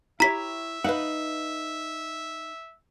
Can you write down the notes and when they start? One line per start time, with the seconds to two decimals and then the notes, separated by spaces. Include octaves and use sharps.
0.20 E4 G4 C#5 E5 A#5 B6
0.84 D#4 B4 F5 F#5